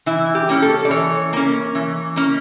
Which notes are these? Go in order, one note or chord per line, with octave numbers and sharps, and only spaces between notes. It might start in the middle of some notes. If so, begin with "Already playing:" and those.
E3 E4
G4
A#3 C#4
A4
D5
E3 C#5
A#3 C#4
E3
A#3 C#4